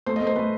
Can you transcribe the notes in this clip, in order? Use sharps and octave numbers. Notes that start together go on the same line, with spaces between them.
A3 C5
D#5
A3
C5
A3 B4